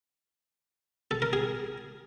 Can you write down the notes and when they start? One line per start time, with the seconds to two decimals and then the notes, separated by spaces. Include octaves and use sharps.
1.11 A4
1.22 A#4
1.33 G#4